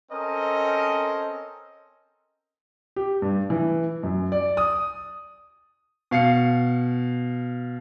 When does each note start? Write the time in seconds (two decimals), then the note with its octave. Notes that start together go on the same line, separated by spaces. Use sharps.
0.11 C4 C#4 A4 A#4 D#5
2.96 G4
3.22 G2
3.50 E3
4.03 F#2
4.32 D5
4.57 D#6
6.11 B2 F5 C7 C#7